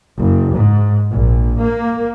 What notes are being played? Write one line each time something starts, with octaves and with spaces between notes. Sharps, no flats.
F#1
G#2
A#1
A#3